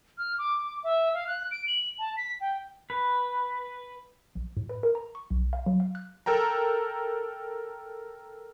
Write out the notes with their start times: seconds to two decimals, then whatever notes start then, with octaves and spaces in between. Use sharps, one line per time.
0.18 F6
0.38 D6
0.84 E5
1.14 F5
1.27 F#6
1.51 D7
1.67 F#7
1.99 A5
2.17 B6
2.40 G5
2.90 B4
4.35 A#1
4.57 A2
4.69 B4
4.83 A#4
4.95 A#5
5.15 C#6
5.30 B1
5.53 F5
5.66 F#3
5.80 F5
5.95 F#6
6.26 A4 A#4 G5 A#5